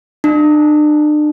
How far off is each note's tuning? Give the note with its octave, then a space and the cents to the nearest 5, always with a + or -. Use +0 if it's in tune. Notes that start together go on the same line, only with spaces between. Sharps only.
D4 +40